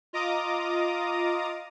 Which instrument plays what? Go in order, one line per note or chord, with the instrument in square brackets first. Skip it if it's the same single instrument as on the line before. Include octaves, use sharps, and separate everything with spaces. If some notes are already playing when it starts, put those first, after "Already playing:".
[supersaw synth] F4 D#5 A#5 D6 D#6